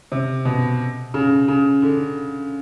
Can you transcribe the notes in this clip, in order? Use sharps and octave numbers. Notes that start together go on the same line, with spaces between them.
C3
B2
C#3
C#3
D3